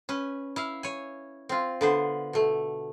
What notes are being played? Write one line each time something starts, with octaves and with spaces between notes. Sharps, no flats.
C#4 B4
E4 E5 F5
C#5 G#5
C4 F4
D3 B3 C5
B2 A3